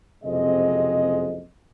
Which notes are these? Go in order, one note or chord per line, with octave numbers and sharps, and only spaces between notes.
F#1 F2 C3 G#3 D#5